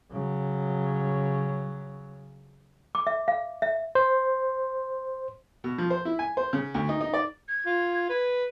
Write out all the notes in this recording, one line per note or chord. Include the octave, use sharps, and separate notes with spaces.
C#3 F#3
D6
E5
F5
E5
C5
B2
F3
C5
E4
G#5
C5
C#3
D2
D#4
D#4
D5
G#6
F4
B4